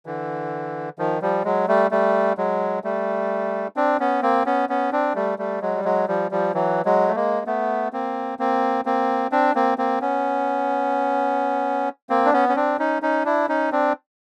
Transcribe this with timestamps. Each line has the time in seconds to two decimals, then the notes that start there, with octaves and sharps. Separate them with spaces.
0.06 D3 E3
0.99 D#3 F3
1.22 F3 G3
1.45 F#3 G#3
1.68 G3 A3
1.91 G3 A3
2.38 F#3 G#3
2.84 G3 A3
3.76 C4 D4
4.00 B3 C#4
4.22 A#3 C4
4.46 B3 C#4
4.69 B3 C#4
4.92 C4 D4
5.15 G3 A3
5.39 G3 A3
5.61 F#3 G#3
5.76 G3
5.85 F#3 G#3
6.08 F3 G3
6.31 F3 G3
6.54 E3 F#3
6.85 F#3 G#3
7.08 A3
7.15 G#3 A#3
7.47 A3 B3
7.93 A#3 C4
8.39 A#3 C4
8.86 A#3 C4
9.32 C4 D4
9.55 A#3 C4
9.78 A#3 C4
10.01 B3 C#4
12.10 A#3 C4
12.25 D4
12.33 B3 C#4
12.49 C#4
12.56 C4 D4
12.79 C#4 D#4
13.02 C#4 D#4
13.25 D4 E4
13.49 C#4 D#4
13.72 C4 D4